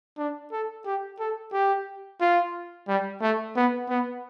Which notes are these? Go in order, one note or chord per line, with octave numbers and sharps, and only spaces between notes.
D4
A4
G4
A4
G4
F4
G3
A3
B3
B3